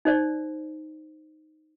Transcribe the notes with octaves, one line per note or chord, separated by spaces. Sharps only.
D#4 C5 D5